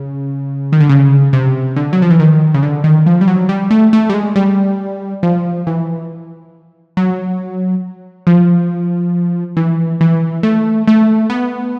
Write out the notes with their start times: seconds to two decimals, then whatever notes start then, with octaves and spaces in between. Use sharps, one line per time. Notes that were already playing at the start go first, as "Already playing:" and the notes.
Already playing: C#3
0.72 D#3
0.80 D3
0.89 C#3
1.33 C3
1.76 D3
1.93 F#3
2.02 F3
2.10 E3
2.20 D#3
2.54 C#3
2.63 D3
2.84 D#3
3.06 F3
3.21 G3
3.28 F#3
3.49 G3
3.71 A3
3.93 A3
4.10 G3
4.14 G#3
4.36 G3
5.23 F3
5.67 E3
6.97 F#3
8.27 F3
9.57 E3
10.01 E3
10.43 A3
10.88 A3
11.30 B3